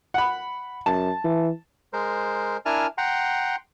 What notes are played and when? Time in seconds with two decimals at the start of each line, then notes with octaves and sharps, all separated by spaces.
0.14 F#5 B5
0.86 F#2 A5
1.24 E3
1.93 G#3 A#4 C5
2.66 D4 E4 A#4 G#5 A5 F6
2.98 F#5 G5 A#5 C6